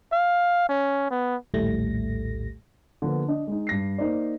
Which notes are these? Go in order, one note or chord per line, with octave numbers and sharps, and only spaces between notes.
F5
C#4
B3
A#1 D#2 A2 G3 A3 A#6
D3 F3 A#3 B3
D4 D#5
G#3 D#4
G2 A#6 C7
A#3 D#4 C5 D5